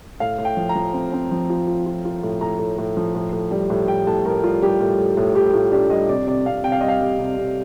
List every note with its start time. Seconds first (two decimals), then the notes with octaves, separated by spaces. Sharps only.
0.20 A2 F5
0.38 A2
0.45 G5
0.57 F3
0.69 A#5
0.75 F3
0.94 C4
1.13 C4
1.31 F3
1.50 F4
1.67 F4
1.86 F4
2.05 F4
2.23 A2
2.41 A2 A#5
2.59 A2
2.78 A2
2.97 F3
3.15 A2
3.33 A2
3.51 G3
3.70 A2
3.88 A2 G5
4.07 A2 A5
4.25 A2 A#4
4.43 G3 F4
4.62 G3 G4
4.80 A2
4.98 A2
5.17 A2
5.35 A2 G4
5.53 A2 F4
5.72 D4 G4
5.90 G3 D#5
6.09 C3 D5
6.27 C3 D5
6.46 C3 F5
6.63 C3 G5
6.72 F5
6.81 G3 D#5
6.88 F5
7.01 G3
7.19 C3
7.37 C3